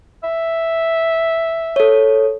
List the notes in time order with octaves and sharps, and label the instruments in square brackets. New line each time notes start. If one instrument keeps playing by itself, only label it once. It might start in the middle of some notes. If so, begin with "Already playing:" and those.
[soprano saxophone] E5
[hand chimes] A4 C#5